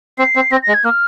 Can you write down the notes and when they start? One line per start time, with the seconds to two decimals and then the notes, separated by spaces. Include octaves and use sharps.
0.18 C4 C7
0.36 C4
0.52 C4 A#6
0.63 A#6
0.68 G#3
0.74 G#6
0.84 A#3 F6